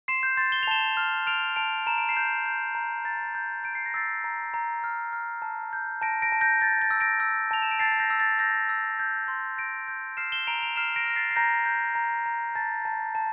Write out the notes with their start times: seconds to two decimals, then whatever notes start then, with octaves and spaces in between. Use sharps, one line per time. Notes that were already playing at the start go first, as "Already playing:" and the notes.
0.08 C6 C7 E7
0.23 G6
0.37 C6 A6
0.52 G7
0.63 F7
0.67 A5 E7 G7
0.97 F6
1.27 F6 D7 F7
1.56 A5 D7 F7
1.87 A#5 E7
1.98 D7
2.08 C7 E7
2.17 G6
2.46 G6
2.75 A#5
3.05 A#5 A6
3.35 G6
3.64 G6 D7
3.75 C7
3.86 A#6
3.94 E6 A6 C7
4.24 A#5
4.54 A#5
4.84 F6
5.13 F6
5.42 A5
5.73 G6
6.02 A5 A#6 D7
6.22 A#6 D7
6.32 A5
6.41 G6 A#6
6.61 G6 A6
6.82 A6
6.91 E6
7.01 A#6 D7
7.20 E6
7.51 A5 F7
7.62 E7
7.71 D7
7.79 A5 A6 C7
7.92 A6
8.00 G6 A#6
8.10 E6
8.20 A6
8.39 E6 G6 A#6
8.69 E6
8.99 G6
9.28 C6
9.58 G6 A#6 D7
9.88 G6
10.17 F6 C7 E7
10.32 E7 G7
10.47 A#5 D7 F7
10.62 D7 F7
10.76 F6 C7 E7
10.96 A#6 D7
11.06 F6 A#6
11.16 A6 C7
11.31 C7
11.36 A#5 G6 A#6
11.66 G6
11.95 A#5
12.26 A#5
12.55 A5 A6
12.85 A5
13.15 A5